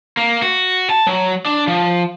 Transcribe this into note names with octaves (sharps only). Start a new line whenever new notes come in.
A#3
F#4
A5
F#3
D4
F3